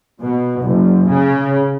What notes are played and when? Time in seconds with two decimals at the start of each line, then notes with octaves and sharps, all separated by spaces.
0.21 B2
0.63 F#1
1.09 C#3